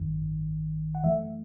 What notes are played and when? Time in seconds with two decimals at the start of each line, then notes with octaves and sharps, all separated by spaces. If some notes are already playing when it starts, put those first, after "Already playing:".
Already playing: G#1 F#2 D#3
0.95 F#5
1.04 F#2 E3 A3 E5